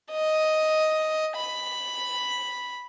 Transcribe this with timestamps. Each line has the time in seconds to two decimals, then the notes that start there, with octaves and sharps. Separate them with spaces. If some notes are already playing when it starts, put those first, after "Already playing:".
0.11 D#5
1.36 B5